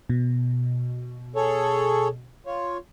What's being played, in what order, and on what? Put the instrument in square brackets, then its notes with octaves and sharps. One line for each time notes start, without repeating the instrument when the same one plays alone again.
[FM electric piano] B2
[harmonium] G#4 A4 C#5
F4 C#5